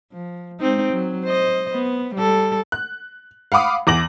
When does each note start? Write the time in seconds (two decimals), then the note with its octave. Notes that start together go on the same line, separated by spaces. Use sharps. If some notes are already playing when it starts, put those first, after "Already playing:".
0.12 F3
0.60 G#3 C4 D#4
0.93 F#3
1.25 C5 D#5
1.72 B3
2.15 G3 A4
2.72 F#6
3.52 F5 F#5 B5 D6 D#6
3.87 E2 D6 A#6 F#7